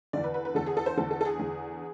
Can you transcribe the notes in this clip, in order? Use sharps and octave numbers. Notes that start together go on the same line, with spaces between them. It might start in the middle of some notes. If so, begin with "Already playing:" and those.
E2 D3 D5
B4
B4
B4
E2 D3 A4
G#4
A4
C5
E2 D3 A4
A4
A4
G#4
E2 D3